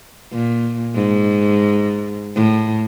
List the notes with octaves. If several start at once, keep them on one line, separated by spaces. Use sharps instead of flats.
A#2
G#2
A2